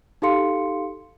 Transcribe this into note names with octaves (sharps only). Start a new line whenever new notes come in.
D#4 G4 A4 F5 C6 C#7